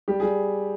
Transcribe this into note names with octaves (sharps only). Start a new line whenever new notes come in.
G3 G4
G3 G#4